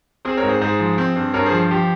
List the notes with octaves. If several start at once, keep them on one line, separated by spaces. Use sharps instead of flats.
C4 G#4 C5
A#4 C#5
G#2
G#4 C5
G#2 G#4 C5
F3
C4
G2
G2 A#4 C#5
G#4 C5
F3
F3 G4